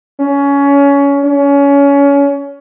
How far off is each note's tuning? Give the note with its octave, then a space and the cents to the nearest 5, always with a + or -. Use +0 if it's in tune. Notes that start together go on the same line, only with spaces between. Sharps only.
C#4 +20
C#4 +25